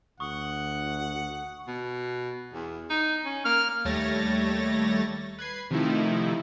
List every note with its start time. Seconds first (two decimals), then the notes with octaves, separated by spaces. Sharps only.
0.20 D2 F#5 C#6 D#6
1.68 B2
2.54 E2
2.90 D#4
3.25 C#4
3.45 A#3 F6
3.85 D#2 G3 A3 C#5 A6 A#6
5.39 B4 G#6 C7
5.71 C3 D#3 F3 A3 D#4 E4